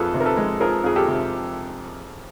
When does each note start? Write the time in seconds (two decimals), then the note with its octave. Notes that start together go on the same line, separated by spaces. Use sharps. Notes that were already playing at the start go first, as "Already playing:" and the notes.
Already playing: F2 F3 G#4 A4 B4
0.14 C3
0.20 A#4
0.25 A4 B4
0.37 G#3
0.60 F3 G#4 A#4
0.84 F2 G#4
0.96 G4 A4
1.08 C3